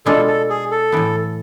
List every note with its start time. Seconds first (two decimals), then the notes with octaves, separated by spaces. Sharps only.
0.06 B2 G#3 B3 D4 F4 A4
0.28 A4
0.50 G#4
0.71 A4
0.92 A2 E3 B3